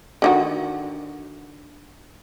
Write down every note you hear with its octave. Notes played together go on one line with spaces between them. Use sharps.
D3 D#3 F#4